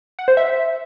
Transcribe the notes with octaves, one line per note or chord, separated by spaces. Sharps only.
F#5
C5
E5